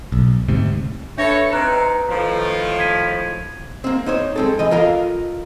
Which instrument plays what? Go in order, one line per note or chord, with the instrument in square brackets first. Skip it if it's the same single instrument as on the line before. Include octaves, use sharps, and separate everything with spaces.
[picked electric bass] B1
D2 G#2 C3
[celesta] D4 E5 A#6 [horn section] A4 B4 C#5
[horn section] C3 C4 D#4 [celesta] B4 A#5 F#6
[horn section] A2 D#3 F3
[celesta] G#6 B6 D#7
[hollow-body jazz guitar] A#3 C4
D#4 C5 C#5
G#3 C4 A4
E3 D#5
F4 A4 A#4 D#5 F5